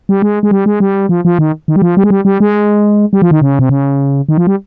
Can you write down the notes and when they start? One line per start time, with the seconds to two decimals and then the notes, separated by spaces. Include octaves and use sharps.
0.09 G3
0.22 G#3
0.43 G#3
0.51 G3
0.66 G#3
0.80 G3
1.09 F3
1.25 F3
1.39 D#3
1.68 D#3
1.76 G3
1.82 F3
1.97 G3
2.04 G#3
2.11 G3
2.25 G3
2.40 G#3
3.13 G3
3.22 F3
3.31 D#3
3.41 C#3
3.59 C3
3.69 C#3
4.29 D#3
4.38 F3
4.47 G3